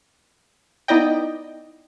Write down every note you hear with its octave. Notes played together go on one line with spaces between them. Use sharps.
B3 D#4 E4 D5 D#5 G5